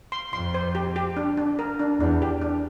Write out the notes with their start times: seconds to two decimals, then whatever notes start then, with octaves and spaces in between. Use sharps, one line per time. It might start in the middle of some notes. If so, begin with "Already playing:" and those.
0.12 C6
0.33 F2 C6
0.54 C5
0.75 G4
0.96 G4
1.17 D4
1.37 D4
1.59 A#4
1.79 D4
2.00 E2 D4
2.22 G4
2.42 D4